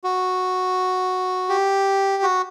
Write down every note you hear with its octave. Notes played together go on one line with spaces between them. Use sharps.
F#4
G4
F#4